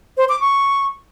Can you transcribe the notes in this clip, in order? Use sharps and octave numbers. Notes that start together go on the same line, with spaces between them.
C5
D6
C#6